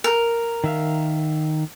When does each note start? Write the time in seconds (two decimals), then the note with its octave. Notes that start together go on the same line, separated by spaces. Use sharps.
0.04 A#4
0.64 D#3 E5 F5